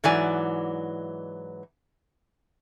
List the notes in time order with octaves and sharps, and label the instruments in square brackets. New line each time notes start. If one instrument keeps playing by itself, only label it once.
[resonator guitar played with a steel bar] G#2 E3 F#3 D5 G#5